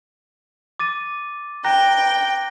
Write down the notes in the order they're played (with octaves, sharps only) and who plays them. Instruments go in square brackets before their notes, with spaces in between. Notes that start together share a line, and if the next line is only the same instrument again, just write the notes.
[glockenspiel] D6 A6 D#7
[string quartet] G5 [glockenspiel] A#5 F#6 A#6